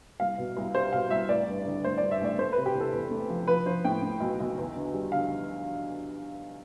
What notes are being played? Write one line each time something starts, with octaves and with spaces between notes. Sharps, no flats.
C2 F5
B2
C2
G3 C5
B2 F5
C2 E5
A1 D5
G2
D3
A1 C5
G2 D5
E5
A1 D5
A3 C5
C3 B4
G4
E2
A4
E2
A3
F3
F3 B4
F3 C5
A2 G5
A2
B1
B1
E2
D3
G3
D3 F5